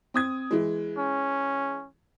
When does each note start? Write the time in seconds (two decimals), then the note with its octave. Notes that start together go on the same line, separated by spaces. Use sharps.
0.14 C4 D#6 G#6
0.51 E3 G#3
0.98 C#4